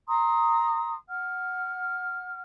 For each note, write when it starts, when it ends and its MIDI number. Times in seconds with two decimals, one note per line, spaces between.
0.08 0.94 82
0.08 0.94 84
0.08 0.94 87
1.08 2.40 78
1.08 2.40 89